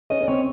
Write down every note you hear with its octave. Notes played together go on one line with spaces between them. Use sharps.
C#4 D#5
C#4
C4 C#5